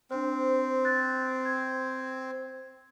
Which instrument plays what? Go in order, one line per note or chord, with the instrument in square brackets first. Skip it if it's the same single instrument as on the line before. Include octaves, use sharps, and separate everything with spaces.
[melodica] C4 [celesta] D4 C5
[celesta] F#6 A6
G#6